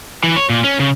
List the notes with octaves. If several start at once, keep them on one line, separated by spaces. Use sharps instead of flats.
E3
C#5
A#2
C#4
C#3